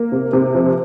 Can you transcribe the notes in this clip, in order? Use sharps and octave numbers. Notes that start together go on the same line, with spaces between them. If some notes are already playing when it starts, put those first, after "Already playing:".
Already playing: A#3
C3
C3
F3